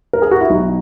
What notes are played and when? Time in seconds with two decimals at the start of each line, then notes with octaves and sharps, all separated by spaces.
0.13 A#4
0.22 G#4
0.31 F#4
0.41 E4
0.50 B1 D#4